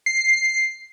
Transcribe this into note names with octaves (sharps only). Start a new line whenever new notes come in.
C7